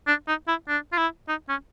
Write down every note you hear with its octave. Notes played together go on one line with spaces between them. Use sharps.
D4
D#4
E4
D4
F4
E4
D#4
C#4